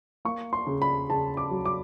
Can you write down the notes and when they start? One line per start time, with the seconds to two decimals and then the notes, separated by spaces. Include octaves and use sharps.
0.25 A#3 C#6
0.53 C6
0.67 C#3
0.82 B5
1.10 C#3 A5
1.37 D6
1.51 F#3
1.65 D6